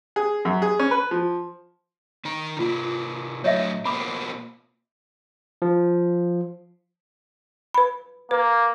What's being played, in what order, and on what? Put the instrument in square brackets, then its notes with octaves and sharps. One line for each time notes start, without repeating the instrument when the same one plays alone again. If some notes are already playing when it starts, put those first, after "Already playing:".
[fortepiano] G#4
F#2
G#4
C#4
B4
F3
[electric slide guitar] D#3 D#4 A#5
[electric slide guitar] C3 A#3 [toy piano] F4
[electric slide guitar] A2 F#3 [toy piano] C#5 D#5 E5
[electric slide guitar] B2 A#3 C4 [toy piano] B5 D6
[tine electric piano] F3
[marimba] B4 B5
[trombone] A#3 [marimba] B4